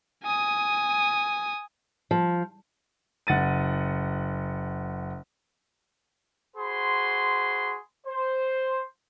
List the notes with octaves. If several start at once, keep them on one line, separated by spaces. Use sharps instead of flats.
G#5 D#6
F3
F#1 F#5 A6 D#7
F#4 G#4 C5 B5 C6
C5